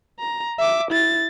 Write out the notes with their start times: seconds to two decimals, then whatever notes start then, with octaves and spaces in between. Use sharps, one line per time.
0.20 A#5
0.59 E5 D6
0.91 E4 A6